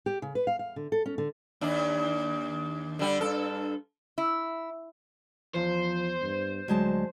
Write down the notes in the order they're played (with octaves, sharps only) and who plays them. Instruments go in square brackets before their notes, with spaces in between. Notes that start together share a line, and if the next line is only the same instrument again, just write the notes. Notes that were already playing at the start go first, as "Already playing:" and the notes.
[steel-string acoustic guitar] G4
C#3
B4
F5
F5
D3
A4
C#4
D3
[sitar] D#2 D4
D3 G3
G2 A4
[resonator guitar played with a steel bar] E4
[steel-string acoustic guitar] E2 [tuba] F3 [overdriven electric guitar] C5
[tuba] G2
[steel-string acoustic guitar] D2 G#3 A5 [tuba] F#3